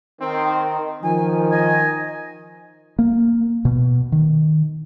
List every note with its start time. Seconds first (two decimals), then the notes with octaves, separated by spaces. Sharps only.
0.21 D#3 C4
1.03 D#3 F3 G#5
1.52 D#5 G#5
2.99 A#3
3.65 B2
4.12 D#3